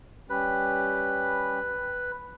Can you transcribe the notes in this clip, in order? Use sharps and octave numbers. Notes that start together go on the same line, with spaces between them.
G3 C#4 G4 B4